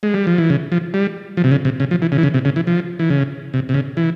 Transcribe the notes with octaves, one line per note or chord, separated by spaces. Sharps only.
G#3
G3
F3
E3
C#3
F3
G3
F3
C3
C#3
C3
C#3
F3
E3
C#3
E3
C#3
C3
C#3
E3
F3
E3
C#3
C3
C3
C#3
E3